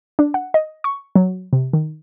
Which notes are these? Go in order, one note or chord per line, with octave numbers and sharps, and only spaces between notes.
D4
F#5
D#5
C#6
F#3
C3
D#3